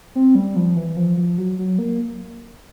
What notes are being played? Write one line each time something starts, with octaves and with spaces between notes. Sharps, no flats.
C4
G3
F3
E3
F3
F3
F#3
F#3
A#3